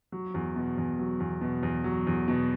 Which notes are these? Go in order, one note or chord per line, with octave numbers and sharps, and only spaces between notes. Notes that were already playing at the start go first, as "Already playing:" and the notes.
F#3
E2
B2
E2
F#3
E2
B2
E2
F#3
E2
B2